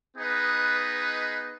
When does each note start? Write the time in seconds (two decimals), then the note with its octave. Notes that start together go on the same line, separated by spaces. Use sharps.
0.15 B3 D#4 G#4 B4 D#5